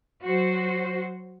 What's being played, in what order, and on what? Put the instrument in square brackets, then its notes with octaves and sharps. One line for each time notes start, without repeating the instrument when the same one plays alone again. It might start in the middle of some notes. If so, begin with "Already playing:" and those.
[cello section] F#3 F#4 C5